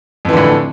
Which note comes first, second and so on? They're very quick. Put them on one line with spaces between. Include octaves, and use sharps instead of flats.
F2 E3 D3 A2